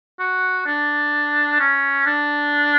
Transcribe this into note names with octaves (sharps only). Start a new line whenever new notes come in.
F#4
D4
C#4
D4